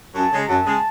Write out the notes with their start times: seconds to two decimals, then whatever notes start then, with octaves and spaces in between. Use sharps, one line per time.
0.15 F#2 A5
0.32 C#3 G#3
0.48 F#2 A5
0.65 C#3 G#3